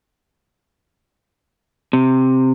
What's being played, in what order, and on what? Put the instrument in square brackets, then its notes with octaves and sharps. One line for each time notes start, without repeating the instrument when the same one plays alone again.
[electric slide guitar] C3